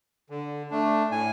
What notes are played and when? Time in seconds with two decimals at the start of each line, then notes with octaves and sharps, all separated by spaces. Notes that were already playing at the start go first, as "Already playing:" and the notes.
0.30 D3
0.71 A3 D4
1.11 A2 G#5